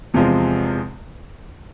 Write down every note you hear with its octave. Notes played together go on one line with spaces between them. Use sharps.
E2 C3 F3 G#3